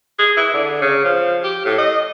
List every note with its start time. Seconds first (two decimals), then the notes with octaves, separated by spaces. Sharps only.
0.19 G#4
0.37 E4
0.54 D3
0.81 C#3
1.04 F3
1.43 G4
1.65 A2
1.78 D#5